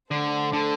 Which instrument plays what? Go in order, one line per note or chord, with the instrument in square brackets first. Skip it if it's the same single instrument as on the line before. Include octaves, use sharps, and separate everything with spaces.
[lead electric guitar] D3 [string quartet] A3 D4 A4 C5
[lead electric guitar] D3